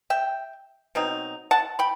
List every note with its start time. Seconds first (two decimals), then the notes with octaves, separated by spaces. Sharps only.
0.10 E5 G5
0.95 B2 F#3 C4 D#4
1.51 F#5 A5
1.79 G5 B5